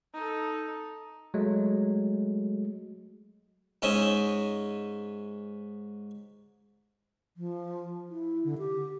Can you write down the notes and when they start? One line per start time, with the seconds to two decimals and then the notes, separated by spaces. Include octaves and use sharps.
0.14 D#4 A4
1.34 F#3 G#3 A3
3.82 G#2 C#4 D#5 E5
7.37 F3
8.09 E4
8.44 D3
8.58 G4